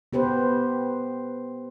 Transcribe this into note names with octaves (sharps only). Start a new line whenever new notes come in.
B3 G4 B4 C5